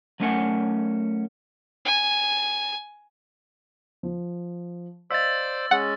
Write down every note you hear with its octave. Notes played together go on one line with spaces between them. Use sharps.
F#3 A3 C#4 A#4 F#5 G#5
G#5
F3
C5 D5 D#5 F5 E6 A6 B6
G#3 C#4 F#5